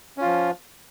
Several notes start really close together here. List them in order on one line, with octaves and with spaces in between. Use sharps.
C#4 F4 F3